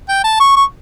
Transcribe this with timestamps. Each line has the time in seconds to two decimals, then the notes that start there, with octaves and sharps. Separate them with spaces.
0.08 G5
0.24 A5
0.40 C#6
0.56 C#6